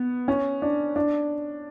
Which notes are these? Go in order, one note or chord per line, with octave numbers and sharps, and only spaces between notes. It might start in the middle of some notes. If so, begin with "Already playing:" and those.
Already playing: B3
C#4
D4
D4